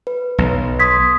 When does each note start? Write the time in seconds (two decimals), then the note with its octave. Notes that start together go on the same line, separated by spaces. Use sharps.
0.07 B4
0.38 B1
0.80 C6 D#6 G#6 B6